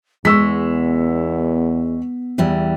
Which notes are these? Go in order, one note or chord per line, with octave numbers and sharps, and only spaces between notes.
E2 G#3 B3 C#6 E6 B6
E2 E3 G3